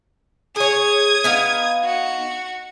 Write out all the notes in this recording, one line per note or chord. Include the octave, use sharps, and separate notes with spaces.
G#4 C#5 D#6 G#6
B3 D#4 F5
F#4